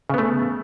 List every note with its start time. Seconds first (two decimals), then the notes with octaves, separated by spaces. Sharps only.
0.10 C#3
0.14 B3
0.18 A3